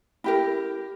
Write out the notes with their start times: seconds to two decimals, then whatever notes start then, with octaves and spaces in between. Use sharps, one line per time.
0.24 E4 G4 A#4